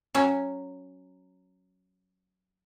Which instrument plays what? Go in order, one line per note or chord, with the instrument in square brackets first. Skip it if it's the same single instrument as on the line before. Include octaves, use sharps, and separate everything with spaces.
[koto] F#3 C#4